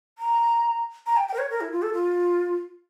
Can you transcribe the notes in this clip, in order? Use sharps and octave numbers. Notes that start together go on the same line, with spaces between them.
A#5
A#5
G5
G5
A#4
C#5
A#4
E4
F4
A4
F4